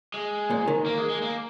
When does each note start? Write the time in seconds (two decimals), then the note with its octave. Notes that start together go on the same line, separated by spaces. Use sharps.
0.14 G#3
0.50 A#2
0.68 D#3
0.86 A#3
0.98 G#3
1.09 G#3
1.22 A#3